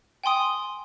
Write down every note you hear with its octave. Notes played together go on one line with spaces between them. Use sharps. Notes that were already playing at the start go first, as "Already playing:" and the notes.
G5 G#5 C6 D#6